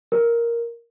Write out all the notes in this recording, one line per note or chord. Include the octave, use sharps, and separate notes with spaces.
A#4